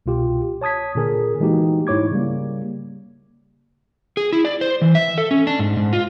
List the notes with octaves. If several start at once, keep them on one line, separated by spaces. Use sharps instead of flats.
C2 B2 F4 G4
C#5 A5 D#6 G#6 B6
A#2 D3 G#4 A#4
E3 G#3 A#3 D#4 F#4 G4
G#2 E4 C#5 D6 G#6
C#3 G3 A#3
G#4
E4
D5
C5
E3
E5
A4
C#4
D4
G#2
G#2
F4